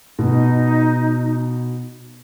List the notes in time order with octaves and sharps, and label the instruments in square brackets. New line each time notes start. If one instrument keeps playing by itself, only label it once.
[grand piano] B2 [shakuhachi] D#4